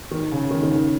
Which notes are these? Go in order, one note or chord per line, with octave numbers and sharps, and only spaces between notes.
D#3
C#3
D#3
D#3
C#3